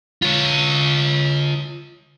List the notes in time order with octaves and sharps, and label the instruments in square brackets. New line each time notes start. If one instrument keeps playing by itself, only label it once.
[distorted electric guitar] F4 C#5